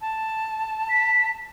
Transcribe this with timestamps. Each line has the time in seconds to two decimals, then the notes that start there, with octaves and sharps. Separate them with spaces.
0.01 A5
0.89 B6